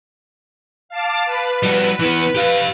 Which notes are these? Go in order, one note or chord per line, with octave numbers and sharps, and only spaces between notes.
F5 A5 D6
B4
G3 F#4
E3 B3
G4 F5